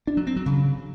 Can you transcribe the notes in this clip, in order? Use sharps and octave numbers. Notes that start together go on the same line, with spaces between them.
D4
F#3
C4
F#3
C#3